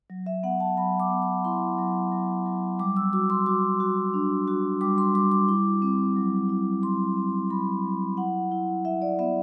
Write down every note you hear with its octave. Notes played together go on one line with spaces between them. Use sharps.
F#3
E5
B3 F#5
A5
F#3 B5
D6
B3
D6
E4 C6
F#3
F#3
F#3
G3 D6
E6
F#4 D6
C6
F#4 D6
F#4
D4
F#4
G3 D6
C6
G3 D6
D6
E4 D6
C4
F#3
E4
F#3 C6
C4
F#3 B5
F#3
E4 F#5
E4
E4 E5
D5
B3 E5